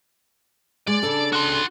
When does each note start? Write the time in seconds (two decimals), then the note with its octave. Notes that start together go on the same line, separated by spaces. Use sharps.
0.87 G#3 D5
1.03 C#3 D4 A4
1.33 F#4 C6